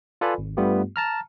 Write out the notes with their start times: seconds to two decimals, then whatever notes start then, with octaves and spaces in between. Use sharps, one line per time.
0.21 F4 A4 B4 D5 G#5 B5
0.38 G#1
0.57 G2 G3 A3 B3 F4 G4
0.96 A5 A#5 F6